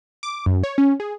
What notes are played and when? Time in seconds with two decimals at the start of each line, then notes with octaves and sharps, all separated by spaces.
0.23 D6
0.46 F#2
0.64 C#5
0.78 C#4
1.00 G#4